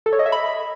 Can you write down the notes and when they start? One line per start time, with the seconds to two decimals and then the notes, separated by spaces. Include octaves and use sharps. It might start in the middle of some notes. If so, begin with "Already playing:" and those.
0.06 A4
0.13 C#5
0.19 D#5
0.26 E5
0.32 B5